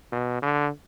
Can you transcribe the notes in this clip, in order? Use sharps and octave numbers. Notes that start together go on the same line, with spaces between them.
B2
D3